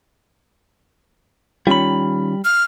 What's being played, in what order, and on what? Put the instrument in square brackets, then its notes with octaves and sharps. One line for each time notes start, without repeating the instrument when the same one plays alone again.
[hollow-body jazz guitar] D#3 C#4 F4 [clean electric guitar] G3 B5
[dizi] F6